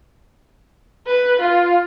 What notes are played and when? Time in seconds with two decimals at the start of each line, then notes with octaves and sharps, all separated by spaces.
1.07 B4
1.40 F4